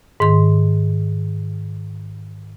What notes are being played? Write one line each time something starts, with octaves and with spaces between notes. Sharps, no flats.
G#2 D#3 C6